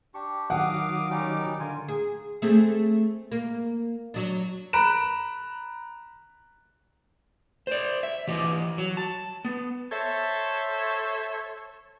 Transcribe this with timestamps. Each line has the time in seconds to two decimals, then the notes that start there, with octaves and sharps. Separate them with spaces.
0.14 D4 G4 C#6
0.50 D#3 F#3 F5 F#5 D6 D#6
1.10 G3 C#4 D#4
1.60 D3 F4 A#4 G#5
1.88 G#4
2.42 A3 C4 G#4
3.32 A#3
4.14 F#3 D4
4.73 A#5 B5 F#6 D7 E7
7.67 C5 D5
8.03 E5
8.27 E3 G4 D#5
8.78 F#3
8.97 A5
9.45 B3
9.92 A4 C5 C#5 E5